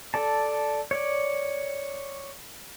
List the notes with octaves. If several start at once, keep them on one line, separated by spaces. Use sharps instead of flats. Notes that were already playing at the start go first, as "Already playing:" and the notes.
A4 D5 A5
C#5 D5